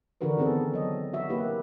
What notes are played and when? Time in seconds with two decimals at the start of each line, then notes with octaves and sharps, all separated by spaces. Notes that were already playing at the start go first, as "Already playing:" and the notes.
0.21 D3 E3 D4 F#4 A#4 B4
0.38 D#3 B3 C4 G#4 A4
0.74 F#3 D#5
1.13 F#4 E5
1.29 A#3 E4 G4 B4